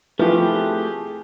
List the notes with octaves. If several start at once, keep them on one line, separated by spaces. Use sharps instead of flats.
F3 A3 C4 E4 G4 G#4 B4